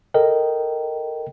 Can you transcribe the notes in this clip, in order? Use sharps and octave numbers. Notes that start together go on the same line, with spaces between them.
A4 A#4 D#5 G5